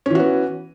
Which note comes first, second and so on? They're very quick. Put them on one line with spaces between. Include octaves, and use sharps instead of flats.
C#4 E3 F#4 B3